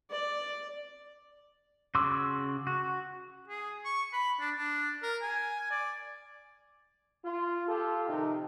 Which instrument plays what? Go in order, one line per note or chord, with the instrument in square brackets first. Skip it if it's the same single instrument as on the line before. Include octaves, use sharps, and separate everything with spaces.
[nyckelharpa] D5
[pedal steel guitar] C#3 F#4 C6 D6 E6
F#4
[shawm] G#4
C#6
B5
D4
D4
A#4
G#5
D5
[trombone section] F4
F4 G4 A4
C3 D#3 F3 D#4